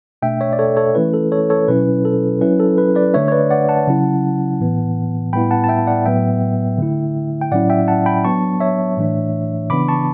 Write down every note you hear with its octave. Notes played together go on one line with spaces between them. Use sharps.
B2 A3 D4 E5 G5
C#5 E5
D5
A4 C#5
A4 C#5
E3 A3 C#4 E4 B4
A4
A4 C#5
A4 C#5
B2 F#3 C#4 E4 B4
A4
F#3 C#4 E4 B4
A4
B4
B4 D5
D3 A3 D4 C#5 E5
C#5
B4 D5
D5 F#5
F#5 A5
C#3 F#3 C#4 E4
A2 E3 B3
A2 G3 B3 E4 G5 B5
F#5 A5
A5
E5 G5
D5 F#5
A2 F#3 B3 E5 G5
D3 A3 E4
G5
A2 F#3 C#4 E4 D5 F#5
E5 G5
F#5 A5
G5 B5
F#3 B3 D4 A5 C#6
C#5 E5
A2 E3 A3 D4
C#3 E3 B3 D4 B5 D6
A5 C#6